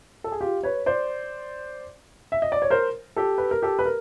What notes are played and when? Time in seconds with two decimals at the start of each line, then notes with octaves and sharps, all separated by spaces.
0.24 A4
0.32 G#4
0.41 F4 G4
0.63 B4 C#5
0.86 C5 D5
2.32 E5
2.42 D#5
2.52 D5
2.62 C#5
2.70 A#4 C5
3.16 G4 A4
3.38 B4
3.51 A#4
3.62 G4 A4
3.79 B4
3.86 A#4